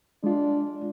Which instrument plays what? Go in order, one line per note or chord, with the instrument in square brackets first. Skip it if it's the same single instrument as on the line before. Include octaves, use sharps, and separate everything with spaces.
[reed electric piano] G#3 F4 [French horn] D4